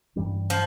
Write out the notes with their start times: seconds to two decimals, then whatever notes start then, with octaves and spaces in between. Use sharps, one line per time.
0.16 G2 E3 G3 C#4
0.50 F3